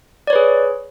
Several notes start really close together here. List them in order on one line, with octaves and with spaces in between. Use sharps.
D5 C#5 B4 G#4